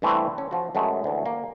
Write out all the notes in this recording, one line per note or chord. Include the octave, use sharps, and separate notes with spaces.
G2 E3 A3 C4 E4
C#4
F3 F#4
F#2 G#3 A3
D2 E3
A#3